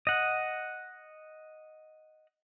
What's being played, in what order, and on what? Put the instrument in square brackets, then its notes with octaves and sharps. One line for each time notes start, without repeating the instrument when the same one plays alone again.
[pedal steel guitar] D#5 F#5